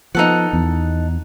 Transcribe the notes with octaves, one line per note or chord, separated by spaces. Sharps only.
F3 B3 D#4 A4 F#5
E2